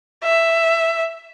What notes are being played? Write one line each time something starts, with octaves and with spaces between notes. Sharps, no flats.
E5